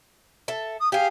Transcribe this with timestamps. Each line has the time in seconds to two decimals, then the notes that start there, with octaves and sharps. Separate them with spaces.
0.48 A4 E5
0.80 D#6
0.92 G4 G#4 F5